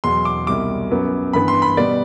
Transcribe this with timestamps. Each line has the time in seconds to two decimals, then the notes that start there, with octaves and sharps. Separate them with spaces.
0.04 E2 B2 F#3 C6
0.25 D6
0.47 C2 B2 G3 D6
0.91 F#2 F#3 B3
1.33 G2 E3 B3 B5
1.48 C6
1.62 B5
1.77 B2 G3 B3 D5